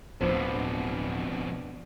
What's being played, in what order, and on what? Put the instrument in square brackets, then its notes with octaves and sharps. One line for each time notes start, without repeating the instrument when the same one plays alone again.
[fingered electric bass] D1 [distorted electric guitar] F2 B2 [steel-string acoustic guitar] F3 B3 D4